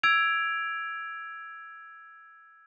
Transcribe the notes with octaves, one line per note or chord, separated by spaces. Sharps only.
E6 G#6 D7 F7